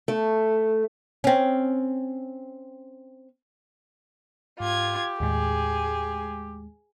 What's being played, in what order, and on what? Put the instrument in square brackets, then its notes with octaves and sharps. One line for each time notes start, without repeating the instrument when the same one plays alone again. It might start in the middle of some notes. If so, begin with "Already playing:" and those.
[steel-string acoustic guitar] A3
[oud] C4 C#4
[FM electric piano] G#2 [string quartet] F4 G#6 [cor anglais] G4
[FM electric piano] D#2 A2 G#3 [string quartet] G#4